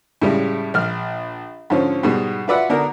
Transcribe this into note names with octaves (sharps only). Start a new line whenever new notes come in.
A2 C#3 G3 G#3
A#1 F6
G#2 D3 F3 C#4
G#2 B2 G3 G#3
F4 F#4 B4 D5 E5 F#5
D3 B3 D4 D#4 F#4 A#4